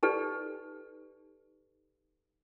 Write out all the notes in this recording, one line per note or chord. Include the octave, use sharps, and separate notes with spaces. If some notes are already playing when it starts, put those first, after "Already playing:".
D#4 G4 A4 B4 D5